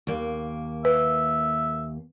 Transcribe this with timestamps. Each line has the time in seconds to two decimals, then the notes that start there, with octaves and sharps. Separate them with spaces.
0.07 D#2 A#3
0.85 B4 E5